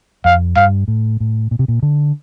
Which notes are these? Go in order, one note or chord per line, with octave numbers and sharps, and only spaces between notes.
F2 F5
G2 F5
A2
A2
A#2
C3
A#2
D3